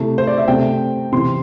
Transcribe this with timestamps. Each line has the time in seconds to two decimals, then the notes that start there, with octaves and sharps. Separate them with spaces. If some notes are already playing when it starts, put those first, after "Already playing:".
Already playing: C3 A3 E4
0.18 C5
0.27 D5
0.38 E5
0.48 C3 A3 C4 G5
1.13 C3 E3 C4 C6